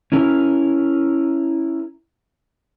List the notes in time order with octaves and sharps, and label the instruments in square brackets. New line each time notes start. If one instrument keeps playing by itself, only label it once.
[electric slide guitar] C#4 E4 A#4